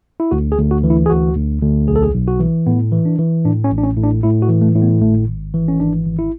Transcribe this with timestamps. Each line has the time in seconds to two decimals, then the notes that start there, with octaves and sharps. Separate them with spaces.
0.20 E4
0.31 D2 F#4
0.52 G#4
0.57 D2
0.71 F#4
0.84 E3
0.90 E4
1.06 G#4
1.10 D2 F#4
1.36 D2
1.62 D2
1.88 B1 G#4
1.96 A4
2.03 G#4
2.14 B1
2.28 F#4
2.40 E3
2.67 A2 B3
2.92 E3
3.05 D4
3.19 E3
3.45 A2 D4
3.64 C#4
3.71 A1
3.78 D4
3.84 C#4
3.97 A2
4.03 D4
4.23 A2 E4
4.42 F#4
4.49 E3
4.61 A3
4.75 A2
4.82 B3
5.01 G#1 A3
5.28 G#1
5.54 E3
5.68 C#4
5.80 G#1 D4
6.06 G#1
6.19 E4